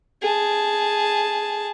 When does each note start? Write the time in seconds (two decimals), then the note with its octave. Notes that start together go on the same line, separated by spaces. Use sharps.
0.22 G#4 A5